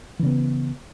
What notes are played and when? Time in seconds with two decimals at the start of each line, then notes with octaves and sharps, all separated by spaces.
0.19 E3
0.23 C#3
0.26 B3